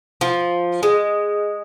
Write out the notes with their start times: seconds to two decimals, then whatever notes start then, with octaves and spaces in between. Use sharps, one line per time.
0.21 F3
0.83 G#3